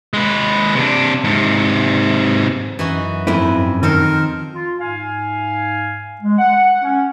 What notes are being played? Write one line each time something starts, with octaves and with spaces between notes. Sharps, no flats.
G#3 B4
C3 D4
G#2 C3
F#2 E3 D#4 F#4
F2 G#2 A3 C4 E4 B4
D#3 D#4 A4 A#4 C5
F4
G#2 F5 G#5
G#3
F#5
C#4